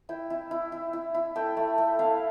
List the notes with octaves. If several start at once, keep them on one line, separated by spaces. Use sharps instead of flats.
E4 G5
E4
E4
E4
E4
E4
A3 G5
A3
A3
E4 F5